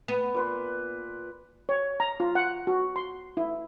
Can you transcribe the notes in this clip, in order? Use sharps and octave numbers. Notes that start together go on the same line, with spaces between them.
B3
A#2 B4 C6
C#5
A#5
F4
F#5
F#4
C6
E4